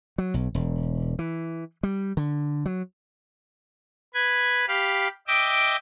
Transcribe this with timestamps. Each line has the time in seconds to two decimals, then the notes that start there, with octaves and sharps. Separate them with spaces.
0.18 F#3
0.34 B1
0.55 E1
1.19 E3
1.83 G3
2.17 D3
2.66 F#3
4.14 B4 G#6
4.68 G4 F5 B5
5.28 D#5 E5 G5 D6